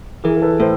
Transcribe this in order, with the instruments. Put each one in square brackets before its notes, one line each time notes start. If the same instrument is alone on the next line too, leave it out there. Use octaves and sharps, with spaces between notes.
[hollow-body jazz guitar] E3 [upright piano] G#4 A#4
[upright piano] A#4
A4 B4
[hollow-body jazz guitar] A2 [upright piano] A#4 C5